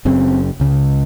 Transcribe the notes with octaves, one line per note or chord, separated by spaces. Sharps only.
F#1 F#2 C#3 C4
C#2 C#3